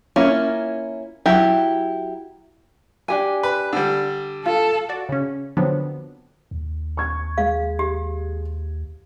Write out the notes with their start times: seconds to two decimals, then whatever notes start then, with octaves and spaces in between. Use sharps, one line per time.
0.16 A#3 C#4 E4 F4
1.26 F#3 E4 G4
3.08 D4 G4 G#5
3.43 B4
3.73 D3 G3
4.46 F4 A4
4.89 F#4 D5
5.09 C#3 C#4
5.57 D3 F3 F#3 B3 C4 D4
6.51 D#2
6.97 C#6 G#6
7.38 G#3 F5
7.79 G4